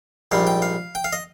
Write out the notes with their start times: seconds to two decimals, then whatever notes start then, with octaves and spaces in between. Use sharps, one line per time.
0.31 A#1 G#2 G3 F5
0.47 G5
0.62 F5
0.95 G5
1.04 F5
1.13 D#5